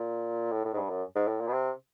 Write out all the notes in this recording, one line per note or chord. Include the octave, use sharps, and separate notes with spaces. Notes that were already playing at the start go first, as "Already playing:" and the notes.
Already playing: A#2
A2
A2
G#2
G2
F#2
G#2
A2
A#2
B2
C3